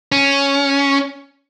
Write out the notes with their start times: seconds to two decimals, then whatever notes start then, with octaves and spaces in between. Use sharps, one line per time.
0.12 C#4